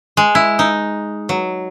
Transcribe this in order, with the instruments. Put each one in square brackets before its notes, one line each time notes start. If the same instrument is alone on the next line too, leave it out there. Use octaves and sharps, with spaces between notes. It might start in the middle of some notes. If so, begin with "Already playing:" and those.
[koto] G#3
E4
D#4
F#3